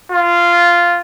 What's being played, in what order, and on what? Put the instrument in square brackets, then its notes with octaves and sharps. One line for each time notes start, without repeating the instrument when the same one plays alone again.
[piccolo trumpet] F4